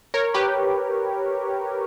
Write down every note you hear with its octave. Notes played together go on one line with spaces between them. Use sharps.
A#4 C#5
G4 B4